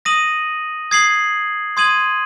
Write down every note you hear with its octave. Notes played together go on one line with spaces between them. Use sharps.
D#6 A#6 D#7 F#7
D#6 G#6 C7 F#7
C6 D#6 G#6 D#7 F#7